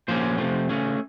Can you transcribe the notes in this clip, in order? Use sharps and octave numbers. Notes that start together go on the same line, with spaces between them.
A#2 F3 A#3 C#4 C5
C3 F3 A3
C#3 A3 C#4